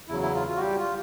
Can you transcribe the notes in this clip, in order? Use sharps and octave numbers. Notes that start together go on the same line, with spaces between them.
E2 C#3 F#3 E4
E4
F4
F4
F#4
G3 G4
F4